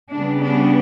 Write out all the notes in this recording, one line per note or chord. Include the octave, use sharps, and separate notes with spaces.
C#3 G3 B3 D4
D4